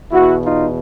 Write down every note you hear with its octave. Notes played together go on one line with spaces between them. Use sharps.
E2 B2 E4 F#4
D#4 F4